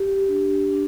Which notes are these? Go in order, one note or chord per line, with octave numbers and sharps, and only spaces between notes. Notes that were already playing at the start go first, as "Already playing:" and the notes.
Already playing: G4
D4
D4